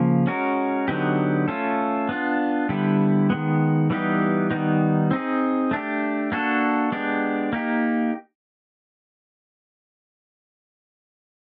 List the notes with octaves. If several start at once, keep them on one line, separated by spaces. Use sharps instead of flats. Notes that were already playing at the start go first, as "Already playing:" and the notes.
Already playing: C#3 F3 A#3
G#3 C#4 F#4 A#4
D3 F#3 B3 D#4 G4
A3 C#4 F4 A4
B3 D4 F4
D3 G3 B3 E4 G4
D#3 G#3 B3
E3 G3 B3 D#4 G4
D#3 G3 B3 D#4
C4 D#4 G#4
A3 D4 G4
A#3 D4 F#4 A4
G#3 B3 D4 G4
A#3 D#4 G4